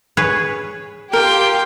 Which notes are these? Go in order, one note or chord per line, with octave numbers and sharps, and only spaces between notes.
G#4 B4 C#5
F4 G4 A#4 G5